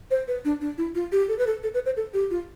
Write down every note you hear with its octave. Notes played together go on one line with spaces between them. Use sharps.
C5
B4
D4
D4
E4
F4
G4
A4
B4
A4
A4
B4
C5
A4
G4
F4